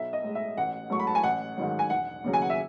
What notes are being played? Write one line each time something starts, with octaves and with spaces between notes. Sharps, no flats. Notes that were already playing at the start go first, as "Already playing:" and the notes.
Already playing: B1 E5
D#5
A2 G#3
E5
A1 F#5
G#2 F#3 A3 C#6
B5
A5
G#5
A1 F#5
G#2 D#3 F#3
G#5
E1 F#5
D#2 C#3 F#3
G#5
F#5
E5